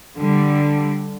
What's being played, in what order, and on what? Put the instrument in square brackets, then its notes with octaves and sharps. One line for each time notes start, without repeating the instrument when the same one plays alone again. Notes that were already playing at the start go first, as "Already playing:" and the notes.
[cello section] D3 G3